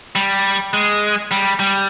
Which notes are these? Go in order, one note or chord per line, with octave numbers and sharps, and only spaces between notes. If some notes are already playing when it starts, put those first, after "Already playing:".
G3
G#3
G3
G3